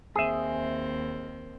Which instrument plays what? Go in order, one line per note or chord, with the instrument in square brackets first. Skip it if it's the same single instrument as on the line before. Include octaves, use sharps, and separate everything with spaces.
[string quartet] D#2 C4 [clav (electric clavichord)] G#4 E5